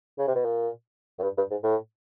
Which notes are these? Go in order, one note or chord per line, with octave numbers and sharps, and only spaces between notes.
C#3
C3
B2
A#2
F#2
G2
G2
G#2
A2